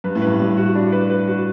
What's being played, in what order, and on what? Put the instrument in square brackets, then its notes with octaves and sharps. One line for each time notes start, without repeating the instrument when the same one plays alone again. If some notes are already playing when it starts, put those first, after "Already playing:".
[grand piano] G2 [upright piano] B4
[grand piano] A2
[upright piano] B4
[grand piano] G2
[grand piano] A2 [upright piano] G3
[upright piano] F#4
D4
B4
B4
F#4